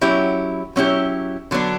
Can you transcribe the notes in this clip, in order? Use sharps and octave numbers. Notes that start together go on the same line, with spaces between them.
F#3 C#4 E4 G4
F#3 C#4 E4 G4
D3 F#3 B3 D4